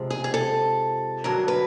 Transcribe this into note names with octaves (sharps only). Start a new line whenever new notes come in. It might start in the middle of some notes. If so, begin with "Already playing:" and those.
Already playing: F2 C3 F3 G#3
G#4
G#4
A4
G2 D3 F#3 A#4
B4